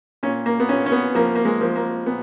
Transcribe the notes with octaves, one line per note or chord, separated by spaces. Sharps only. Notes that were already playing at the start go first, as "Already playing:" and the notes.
A#2 C#4
A#3
B3
A#2 C#4
C#4
B3
F3 A#3
A#3
G#3
F3
A#3
A#2 B3